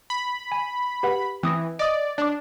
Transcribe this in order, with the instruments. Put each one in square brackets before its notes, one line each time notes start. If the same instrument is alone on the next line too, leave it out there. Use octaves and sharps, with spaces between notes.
[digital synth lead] B5
[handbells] G#5
G4 B4 F#5
[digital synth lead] E3 [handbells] C4 D#6 A#6
[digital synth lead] D5 [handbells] D#5 D#6
[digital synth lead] D4 [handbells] D5 D6